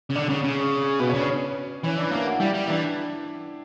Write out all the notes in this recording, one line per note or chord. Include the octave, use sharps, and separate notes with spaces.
C#3
D3 D5
C#3
C#3
B2 B4
C#5
C#3 D4
C#4
E3 C#4
D4
A#3 E4
F#4
G3 E4
G3
E3 D4